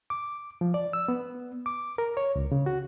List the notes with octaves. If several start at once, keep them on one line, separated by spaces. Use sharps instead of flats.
D6
F3
D5
E6
B3
D6
A#4
C#5
C#2
C#3
F#4